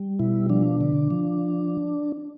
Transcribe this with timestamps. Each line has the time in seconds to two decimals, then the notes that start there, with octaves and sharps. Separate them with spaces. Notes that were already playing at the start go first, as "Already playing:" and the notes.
Already playing: G3
0.19 B2 E4
0.49 F3 D4
0.81 D3
1.11 F3